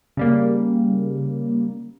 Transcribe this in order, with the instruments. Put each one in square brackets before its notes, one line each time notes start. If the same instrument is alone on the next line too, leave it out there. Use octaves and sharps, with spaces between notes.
[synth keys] C#3 G3 A#3